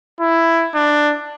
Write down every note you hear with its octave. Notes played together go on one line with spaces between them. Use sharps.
E4
D4